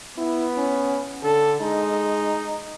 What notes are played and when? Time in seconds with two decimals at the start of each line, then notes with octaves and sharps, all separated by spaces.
0.18 B3 E4
0.58 C#4
1.23 D3 A4
1.61 G#3 D#4